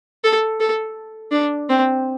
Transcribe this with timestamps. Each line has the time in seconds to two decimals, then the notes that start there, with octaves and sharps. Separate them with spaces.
0.24 A4
0.60 A4
1.32 D4
1.70 C4